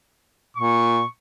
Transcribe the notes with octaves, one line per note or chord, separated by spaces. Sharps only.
A#2 C#6